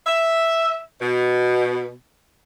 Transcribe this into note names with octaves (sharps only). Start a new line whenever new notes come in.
E5
B2